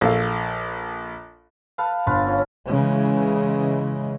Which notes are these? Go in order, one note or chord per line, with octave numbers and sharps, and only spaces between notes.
A#1 A4 F5
A4 B4 F5
G1 F4 B4
C#4
C#3 E3 G#3